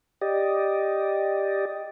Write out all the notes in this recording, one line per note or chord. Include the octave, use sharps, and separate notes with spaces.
G4 D5 D#5